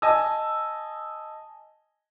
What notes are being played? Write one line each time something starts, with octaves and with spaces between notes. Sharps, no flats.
D#5 G#5 A5 D#6 E6